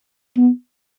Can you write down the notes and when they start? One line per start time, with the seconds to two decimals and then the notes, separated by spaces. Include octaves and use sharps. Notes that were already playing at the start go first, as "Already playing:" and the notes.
0.37 B3